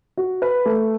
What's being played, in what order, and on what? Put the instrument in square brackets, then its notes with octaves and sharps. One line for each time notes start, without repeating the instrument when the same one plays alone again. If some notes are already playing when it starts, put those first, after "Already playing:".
[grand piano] F#4
B4
A3